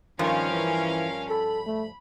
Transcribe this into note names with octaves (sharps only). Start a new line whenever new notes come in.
G2 D#3 F3 C#4 A#4 F5
E3
A4 B5
A3